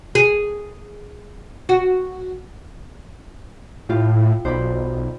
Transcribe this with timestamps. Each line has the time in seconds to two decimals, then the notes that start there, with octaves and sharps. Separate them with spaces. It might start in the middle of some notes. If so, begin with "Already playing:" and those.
0.15 G#4
1.69 F#4
3.89 A2 F4 G4
4.45 B1 C5 D5 B5